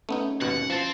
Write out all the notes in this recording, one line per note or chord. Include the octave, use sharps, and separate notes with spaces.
A3 B3 C#4 D#4
G#1 D#2 B2 F#5
F3 C4 A5